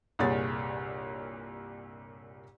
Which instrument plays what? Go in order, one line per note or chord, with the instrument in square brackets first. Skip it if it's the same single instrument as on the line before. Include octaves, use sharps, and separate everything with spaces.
[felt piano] C2 G2 A#2 G#4 C#5 A6